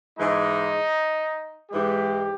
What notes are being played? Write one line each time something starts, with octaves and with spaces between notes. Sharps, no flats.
G#2 E3 G#3 D#4
G#2 E3 G#3 G4